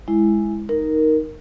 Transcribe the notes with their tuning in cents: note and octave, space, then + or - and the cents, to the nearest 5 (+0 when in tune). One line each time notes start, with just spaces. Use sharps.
G#3 +0 E4 +0
D#4 +0 A#4 +0